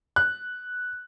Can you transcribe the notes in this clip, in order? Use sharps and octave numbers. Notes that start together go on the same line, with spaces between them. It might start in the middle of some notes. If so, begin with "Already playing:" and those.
F#6